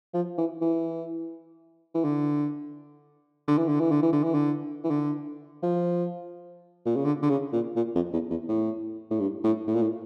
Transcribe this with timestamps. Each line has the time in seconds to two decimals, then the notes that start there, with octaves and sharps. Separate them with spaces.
0.14 F3
0.38 E3
0.61 E3
1.95 E3
2.04 D3
3.48 D3
3.58 E3
3.69 D3
3.80 E3
3.91 D3
4.02 E3
4.13 D3
4.23 E3
4.34 D3
4.84 E3
4.90 D3
5.63 F3
6.86 A#2
6.96 C#3
7.05 D3
7.22 D3
7.30 C#3
7.53 A#2
7.76 A#2
7.95 F2
8.13 E2
8.30 E2
8.49 A2
9.10 A2
9.20 G2
9.44 A2
9.67 A2
9.74 A#2
9.82 A2